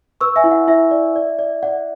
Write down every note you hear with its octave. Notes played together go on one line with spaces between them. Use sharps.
B4 C#6 E6
E5 G#5
E4
F#5
E4 E5
D5
D5
D5
D5 F#5